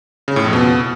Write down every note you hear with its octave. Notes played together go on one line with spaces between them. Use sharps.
C#3
A2
F2
B2